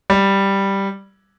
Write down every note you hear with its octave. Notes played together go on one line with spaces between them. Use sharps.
G3